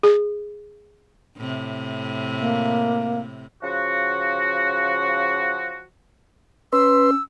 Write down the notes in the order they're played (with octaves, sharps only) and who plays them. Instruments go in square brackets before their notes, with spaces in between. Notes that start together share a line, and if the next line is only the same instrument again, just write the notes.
[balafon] G#4
[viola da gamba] A2 C3
[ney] A#3
[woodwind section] C#3 F3 F#4
[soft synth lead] C#4 [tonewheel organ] B4 C6 [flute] E6